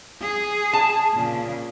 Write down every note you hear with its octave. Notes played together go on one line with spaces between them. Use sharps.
G#4
A5
A#2 C#3